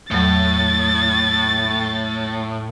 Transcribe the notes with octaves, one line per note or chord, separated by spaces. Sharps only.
E2 A2 F#3 A6